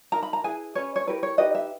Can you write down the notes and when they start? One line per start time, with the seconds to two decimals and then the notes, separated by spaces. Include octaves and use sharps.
0.12 D#4 A#4 A#5
0.23 B5
0.33 A#5
0.44 E4 G#4 B4 G#5
0.75 C#4 G#4 B4 C#5
0.96 C#5
1.07 E4 G4 A#4 B4
1.23 C#5
1.38 D#4 G4 B4 D#5
1.55 E5